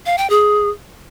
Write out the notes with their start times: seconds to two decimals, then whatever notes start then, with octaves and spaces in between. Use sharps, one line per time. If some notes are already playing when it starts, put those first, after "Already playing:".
0.06 F5
0.18 G5
0.30 G#4